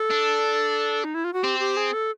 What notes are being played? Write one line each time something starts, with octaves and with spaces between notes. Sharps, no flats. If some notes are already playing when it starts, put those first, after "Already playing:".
Already playing: A4
D4
D#4
E4
F4
F#4
C4 G4
G4
G#4
A4